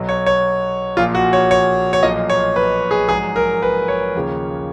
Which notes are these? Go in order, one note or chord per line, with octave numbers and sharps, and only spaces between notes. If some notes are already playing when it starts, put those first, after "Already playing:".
Already playing: B1 B2 F#3
C#5
C#5
A#1 A#2 F3 F4
F#4
C#5
C#5
C#5
B1 A#2 F3 D#5
C#5
B4
G#4
A#1 G#2 F#3 G#4
A#4
B4
C#5
D#2 C#3 F3